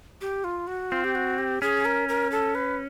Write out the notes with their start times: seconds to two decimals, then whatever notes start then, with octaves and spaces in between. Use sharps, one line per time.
0.21 G4
0.44 F4
0.67 F#4
0.91 C4 F4
1.04 G4
1.15 F#4
1.38 G4
1.62 C#4 G#4
1.85 A#4
2.09 A#4
2.31 A4
2.55 B4